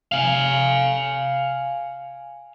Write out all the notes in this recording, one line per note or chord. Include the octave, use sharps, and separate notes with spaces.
F5 G#5